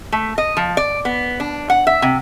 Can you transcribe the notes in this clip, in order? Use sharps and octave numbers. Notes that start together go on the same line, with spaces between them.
A3
D#5
F3
D5
B3
D4
F#5
E5
C3